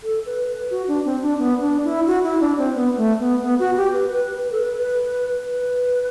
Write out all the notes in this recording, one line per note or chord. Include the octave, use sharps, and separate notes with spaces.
A4
B4
B4
F#4
D4
C4
D4
B3
D4
E4
F#4
E4
D4
C4
B3
A3
B3
B3
F#4
G4
B4
B4
B4
A4
B4
B4
B4